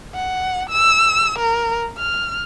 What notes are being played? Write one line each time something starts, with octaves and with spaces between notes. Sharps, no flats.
F#5
E6
A#4
F6